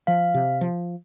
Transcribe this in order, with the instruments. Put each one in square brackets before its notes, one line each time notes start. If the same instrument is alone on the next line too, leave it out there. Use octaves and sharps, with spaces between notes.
[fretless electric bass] F3 [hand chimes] F5
[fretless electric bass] C3
F3